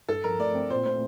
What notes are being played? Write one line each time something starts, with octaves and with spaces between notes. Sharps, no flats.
G2 A4
F3 A#4
A3 D5
C4
A#2 C5
A3 C5